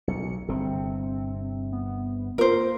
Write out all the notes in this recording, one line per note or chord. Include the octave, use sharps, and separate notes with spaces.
B1 C#7
G1 C3 C4
B3
A#3 F4 A#4 C5